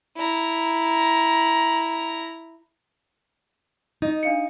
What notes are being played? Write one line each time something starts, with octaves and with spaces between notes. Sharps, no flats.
E4 A#5
D#4 D#5
D4 F5 C#7